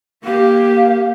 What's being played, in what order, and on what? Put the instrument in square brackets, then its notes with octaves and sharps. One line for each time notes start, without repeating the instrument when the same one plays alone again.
[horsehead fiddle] A#3 G4 [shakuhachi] F5